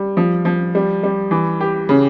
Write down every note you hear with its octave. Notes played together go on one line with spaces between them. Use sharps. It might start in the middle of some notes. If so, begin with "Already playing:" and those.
Already playing: G3
F3
F3
G3
G3
E3
G4
C#3